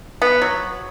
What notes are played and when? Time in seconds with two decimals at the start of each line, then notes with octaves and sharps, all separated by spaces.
0.22 B3
0.42 F#3